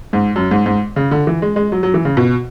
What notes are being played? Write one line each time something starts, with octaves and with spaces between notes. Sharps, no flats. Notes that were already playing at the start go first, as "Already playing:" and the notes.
G#2
F#2
G#2
G#2
C#3
D3
E3
G#3
G#3
F#3
F#3
E3
C#3
B2